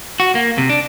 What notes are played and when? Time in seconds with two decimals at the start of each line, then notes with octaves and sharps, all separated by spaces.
0.20 F#4
0.35 A#3
0.58 C3
0.69 D4